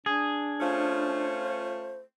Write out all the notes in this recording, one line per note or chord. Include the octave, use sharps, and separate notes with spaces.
D4 G#4
A3 C#4 F4 C5